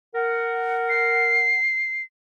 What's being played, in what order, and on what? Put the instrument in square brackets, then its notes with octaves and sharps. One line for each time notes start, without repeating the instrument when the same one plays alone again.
[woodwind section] A#4 F#5
[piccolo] C7